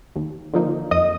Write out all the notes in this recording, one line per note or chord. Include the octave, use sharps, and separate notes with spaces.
D#2
D3 F3 A#3 D#4
F2 D#5 D#6